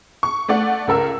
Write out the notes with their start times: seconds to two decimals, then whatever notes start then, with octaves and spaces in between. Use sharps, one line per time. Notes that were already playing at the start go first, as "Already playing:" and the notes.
0.23 C#6
0.48 A3 D5 F#5
0.88 C#2 A4 A#4 E6